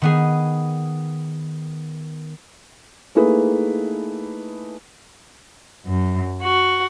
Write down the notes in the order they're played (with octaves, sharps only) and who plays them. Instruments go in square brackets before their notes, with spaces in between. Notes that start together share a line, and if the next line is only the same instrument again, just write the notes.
[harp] D#3 B3 G#4
[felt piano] A3 A#3 D#4 E4 G#4 B4
[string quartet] F#2
F#4